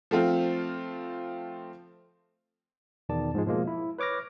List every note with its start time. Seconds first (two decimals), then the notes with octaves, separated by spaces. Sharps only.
0.11 F3 A3 C4 F4
3.09 E2 B2 D#3 D5 A5
3.34 G#2 F3 G#3
3.46 B2 F3 G#3 A#3
3.67 E4
3.98 B4 C#5 D6 F6 A#6